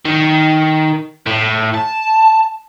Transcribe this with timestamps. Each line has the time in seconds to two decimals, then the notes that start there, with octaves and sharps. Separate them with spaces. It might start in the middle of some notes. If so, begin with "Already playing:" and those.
0.05 D#3
1.27 A2
1.74 A5